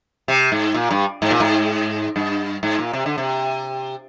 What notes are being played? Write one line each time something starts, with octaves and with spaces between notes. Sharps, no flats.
C3
G#2
A#2
G2
G#2
A#2
G#2
G2
G#2
A#2
C3
D3
C3